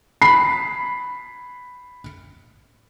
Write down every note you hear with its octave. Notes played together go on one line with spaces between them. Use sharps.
B5 C7